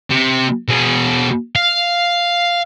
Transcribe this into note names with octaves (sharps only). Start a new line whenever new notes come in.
C3
B2 G#4
F5